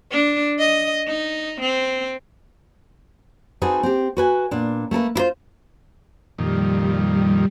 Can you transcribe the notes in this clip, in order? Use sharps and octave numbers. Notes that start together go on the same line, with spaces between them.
D4
D#5
D#4
C4
C4 D#4 F#4 G#4 A4 B4
C4 G4
F#4 B4 G#5
A#2 B3 D4
A3 A#3 A4 B4
E4 F4 C5
F2 A#2 D#3 G3